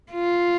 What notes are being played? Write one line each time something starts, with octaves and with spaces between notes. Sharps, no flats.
F4